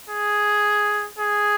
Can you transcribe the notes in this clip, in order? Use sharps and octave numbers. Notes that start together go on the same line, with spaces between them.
G#4
G#4